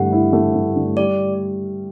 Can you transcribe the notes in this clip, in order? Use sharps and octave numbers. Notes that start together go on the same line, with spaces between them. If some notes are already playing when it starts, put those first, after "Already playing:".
Already playing: G2 D3 A3 E4 F#5
E4
A3
G2
D3
G3 D5